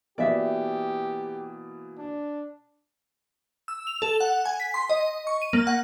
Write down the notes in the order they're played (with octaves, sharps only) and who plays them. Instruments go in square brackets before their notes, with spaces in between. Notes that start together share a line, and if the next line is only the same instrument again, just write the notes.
[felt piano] B2 E3 A#3 [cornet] G4 [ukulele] D5 E5
[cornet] D4
[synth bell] E6
F7
A4
F#5
G#5
B6
C6
D#5
C#6
D#7
A#3
F#5